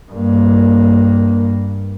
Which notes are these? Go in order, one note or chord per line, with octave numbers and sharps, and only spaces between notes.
G2 A#3